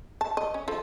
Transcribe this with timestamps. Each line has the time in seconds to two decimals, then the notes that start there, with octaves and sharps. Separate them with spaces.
0.21 A5
0.37 D#5
0.54 C#4
0.68 F3 A4